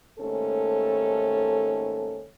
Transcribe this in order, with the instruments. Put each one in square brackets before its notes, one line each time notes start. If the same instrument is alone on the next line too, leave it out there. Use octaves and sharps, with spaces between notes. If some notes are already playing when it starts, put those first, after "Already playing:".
[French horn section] D#2 G#2 A3 C#4 A4